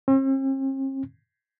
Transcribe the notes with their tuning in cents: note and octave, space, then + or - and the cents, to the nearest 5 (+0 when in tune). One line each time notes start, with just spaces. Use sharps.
C4 +45